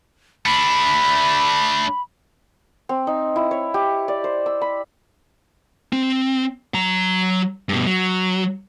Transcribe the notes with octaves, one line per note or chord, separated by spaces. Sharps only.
A3 D4 B5
C4
D#4
E4
C#5
G4
D5
C5
E6
B5
C4
F#3 A#5
G2 B2
F#3